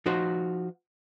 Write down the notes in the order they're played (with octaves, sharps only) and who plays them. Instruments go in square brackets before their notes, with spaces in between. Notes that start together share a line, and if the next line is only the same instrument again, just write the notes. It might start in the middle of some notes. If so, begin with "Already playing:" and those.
[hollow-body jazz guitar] F3 D#4 F#4 C5